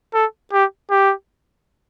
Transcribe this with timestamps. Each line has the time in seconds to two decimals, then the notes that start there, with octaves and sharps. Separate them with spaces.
0.14 A4
0.53 G4
0.90 G4